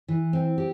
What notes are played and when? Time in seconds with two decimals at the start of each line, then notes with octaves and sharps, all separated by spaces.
0.08 E3
0.33 C4
0.58 G4